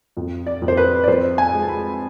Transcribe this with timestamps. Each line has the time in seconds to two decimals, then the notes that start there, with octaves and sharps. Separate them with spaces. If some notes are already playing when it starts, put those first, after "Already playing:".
0.17 F2
0.47 D5
0.62 F2
0.68 C5
0.77 B4
1.04 D5
1.07 F2 C5
1.38 G#5
1.53 G#3
1.63 A5
1.69 B5